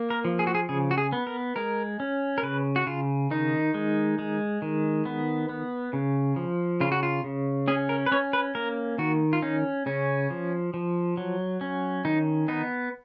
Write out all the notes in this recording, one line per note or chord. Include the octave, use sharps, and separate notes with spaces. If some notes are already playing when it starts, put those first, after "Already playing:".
Already playing: A#3
A#4
F3
G#4
F#4
G#4
C#3 G#4
F#4
G#4
B3
A#4
G#3 A#4
C#4
A#4
C#3 B4
F#4
C#3 F4
D#3 D#4
G#3
G#3
D#3
B3
B3
C#3
F3
C#3 F4
F#4
F4
C#3
C#4 G#4
A#4
B4
C#4 C#5
B4
A#3 A#4
D#3 F#4
F4
C#4 D#4
C#3 C#4
F3
F3
F#3
C#4
D#3 D#4
B3 D#4